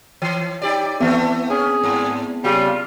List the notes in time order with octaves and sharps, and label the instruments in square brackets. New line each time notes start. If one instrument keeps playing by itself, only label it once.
[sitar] E3 [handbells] C#5
[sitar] D#4 G4 D5
[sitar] E3 A3 [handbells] B3 C4 E5
[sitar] C#4 [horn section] G#4
[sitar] G#2
[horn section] C#3 G3 [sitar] F4